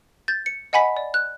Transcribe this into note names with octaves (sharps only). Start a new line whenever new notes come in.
G6 A6
C#7
D#5 F#5 G#5 B5 B6
D5
F#6